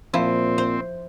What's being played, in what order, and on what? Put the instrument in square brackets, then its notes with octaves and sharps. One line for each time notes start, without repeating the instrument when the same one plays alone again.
[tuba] A#2 [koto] F3 E4 [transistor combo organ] C4
[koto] C5